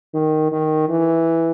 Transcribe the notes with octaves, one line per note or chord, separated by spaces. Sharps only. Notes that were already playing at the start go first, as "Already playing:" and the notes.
D#3
D#3
E3